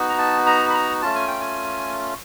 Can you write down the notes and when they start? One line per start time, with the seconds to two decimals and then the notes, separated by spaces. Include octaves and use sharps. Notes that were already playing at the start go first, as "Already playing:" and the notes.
Already playing: B3 D#4 F#4
0.09 A#5
0.18 A5
0.46 A#5
0.70 B5
0.74 A#5
1.02 A3 C#4 F4 A5
1.15 G#5
1.28 G5
1.40 G#5